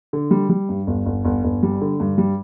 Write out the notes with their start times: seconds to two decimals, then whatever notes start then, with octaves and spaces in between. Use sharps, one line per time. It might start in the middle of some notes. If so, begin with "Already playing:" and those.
0.13 D3
0.31 G3
0.49 G3
0.69 G2
0.87 G1
1.06 G1
1.25 G1
1.44 G1
1.63 G3
1.81 D3
2.00 G2
2.18 G3